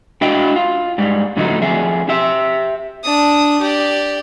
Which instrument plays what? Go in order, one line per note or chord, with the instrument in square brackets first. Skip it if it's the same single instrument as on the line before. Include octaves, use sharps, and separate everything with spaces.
[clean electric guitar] D4 E4 F#4 D#5 G5
F4
G#2 G3
A2 D3 F3 F#3 A3 D#4
F2 G#4 E5
G4 E5
[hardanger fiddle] D4 D#6
G4 D5